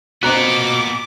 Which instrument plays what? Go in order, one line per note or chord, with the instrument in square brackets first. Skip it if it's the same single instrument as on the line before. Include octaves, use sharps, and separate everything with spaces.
[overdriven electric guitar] A#2 B3 [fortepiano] C4 A#5 F#6 [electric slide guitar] F#4 D#5 [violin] D6